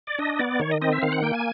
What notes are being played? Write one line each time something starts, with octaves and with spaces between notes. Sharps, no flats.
D5
D4 D#5
B3 D5
D#3 C#5
D#5
C4 D#5
E5
D#3 F5
F#5
A#3 G5
G#5